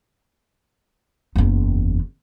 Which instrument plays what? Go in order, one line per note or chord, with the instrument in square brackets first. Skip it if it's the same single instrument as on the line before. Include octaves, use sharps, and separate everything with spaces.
[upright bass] F#1 E2